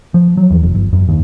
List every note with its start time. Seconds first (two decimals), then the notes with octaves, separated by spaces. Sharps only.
0.14 F3
0.37 F#3
0.50 E2
0.63 F1
0.75 G1
0.93 F#2
1.09 D#2